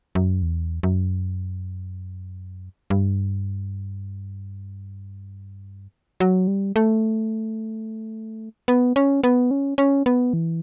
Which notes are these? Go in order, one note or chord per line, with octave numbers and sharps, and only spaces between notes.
F#2
E2
F#2
G2
F#3
G3
A3
B3
C#4
B3
C#4
C#4
B3
E3